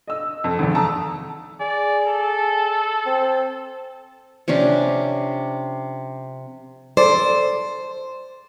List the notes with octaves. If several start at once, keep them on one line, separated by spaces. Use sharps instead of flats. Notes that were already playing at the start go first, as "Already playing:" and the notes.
D#5 E6
F2
G#1 E2
A5 A#5 D#6 E6
G#4 D5
A4
C4
C3 F3 C#4 D4
A4 C5 D5